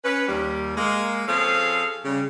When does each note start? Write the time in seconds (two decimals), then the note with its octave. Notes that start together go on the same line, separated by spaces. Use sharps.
0.04 C#4 B4
0.27 D#2 G3 A#3
0.77 G#3 A#3
1.27 F3 C4 C#4 G#4 A4 F5
2.04 C#3 G3